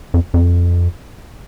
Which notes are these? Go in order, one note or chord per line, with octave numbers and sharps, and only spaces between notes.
F2
F2